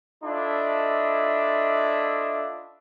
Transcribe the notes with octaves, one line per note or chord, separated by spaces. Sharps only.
D4 E4 F4 A4 D#5 E5